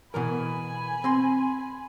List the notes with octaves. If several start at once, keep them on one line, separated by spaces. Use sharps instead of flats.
B2 E3 A#4 G#5 B5
C4 C6